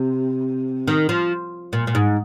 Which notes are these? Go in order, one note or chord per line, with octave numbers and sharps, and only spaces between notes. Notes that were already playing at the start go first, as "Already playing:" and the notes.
Already playing: C3
D#3
F3
A#2
A#2
G#2